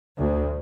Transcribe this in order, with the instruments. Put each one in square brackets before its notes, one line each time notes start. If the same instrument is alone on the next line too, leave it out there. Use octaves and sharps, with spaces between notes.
[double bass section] D2